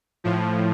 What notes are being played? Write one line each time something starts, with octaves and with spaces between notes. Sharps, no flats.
A2 F3